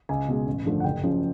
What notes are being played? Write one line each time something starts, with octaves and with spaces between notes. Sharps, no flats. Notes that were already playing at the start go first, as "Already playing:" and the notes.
C#2 G#5
B2 G#3
A1
G2 D3 F3 A3
F#5
F#1 G5
F#2 C#3 F3